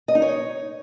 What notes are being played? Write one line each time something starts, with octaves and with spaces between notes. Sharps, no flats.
D#5
D#4
C#5